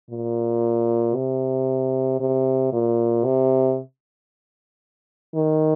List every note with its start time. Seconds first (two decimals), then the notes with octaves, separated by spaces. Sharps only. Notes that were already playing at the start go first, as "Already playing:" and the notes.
0.10 A#2
1.15 C3
2.20 C3
2.72 A#2
3.25 C3
5.35 D#3